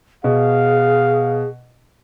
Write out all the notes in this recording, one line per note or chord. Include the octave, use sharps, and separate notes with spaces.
B2 G#4 F5